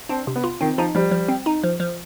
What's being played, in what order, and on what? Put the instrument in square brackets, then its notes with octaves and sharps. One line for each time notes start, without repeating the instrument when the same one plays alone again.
[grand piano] C4 [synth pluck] D4
[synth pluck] C3
[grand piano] B3
[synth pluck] F4
[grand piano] D#3 [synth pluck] C4
[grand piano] F3 [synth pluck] D#4
[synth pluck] F3 [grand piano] G3
[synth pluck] F3
C4
D#4
F3
F3